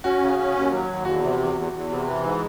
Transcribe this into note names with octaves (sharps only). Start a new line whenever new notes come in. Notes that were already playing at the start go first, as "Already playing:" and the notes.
C#4 F#4
C#3
C#4
D#2
F#3
D#2
E2 F#4
C3
E2
E2
E2
C3
E3
G#2